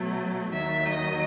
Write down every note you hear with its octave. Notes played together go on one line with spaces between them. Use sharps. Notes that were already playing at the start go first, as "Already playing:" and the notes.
Already playing: B2 F#3 A3
D#2 D#3 F#3 E5
D#5